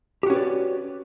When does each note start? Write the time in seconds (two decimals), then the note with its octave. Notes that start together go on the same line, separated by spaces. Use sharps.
0.23 G4
0.27 F#4
0.30 C#4
0.33 B4
0.36 D5